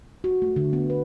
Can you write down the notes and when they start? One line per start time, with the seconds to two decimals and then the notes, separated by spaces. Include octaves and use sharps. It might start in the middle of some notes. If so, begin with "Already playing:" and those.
0.24 F#4
0.42 A3
0.56 D3
0.73 B3
0.90 B4